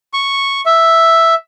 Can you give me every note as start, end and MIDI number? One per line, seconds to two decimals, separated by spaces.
0.13 0.61 85
0.66 1.34 76